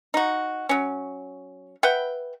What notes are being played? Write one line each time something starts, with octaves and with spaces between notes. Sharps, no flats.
D#4 F#4
F#3 C#4
B4 E5 F#5 G5